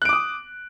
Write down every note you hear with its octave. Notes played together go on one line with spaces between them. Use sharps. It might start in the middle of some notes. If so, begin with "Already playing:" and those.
D6 D#6 F#6 D7